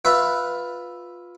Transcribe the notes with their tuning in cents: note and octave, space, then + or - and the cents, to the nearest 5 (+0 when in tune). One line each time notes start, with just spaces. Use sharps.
F4 +15 B4 +0 E5 +0